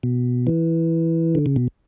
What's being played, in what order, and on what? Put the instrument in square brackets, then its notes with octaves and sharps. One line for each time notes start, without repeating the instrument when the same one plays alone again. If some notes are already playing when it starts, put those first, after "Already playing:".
[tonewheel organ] B2
E3
D3
C#3
B2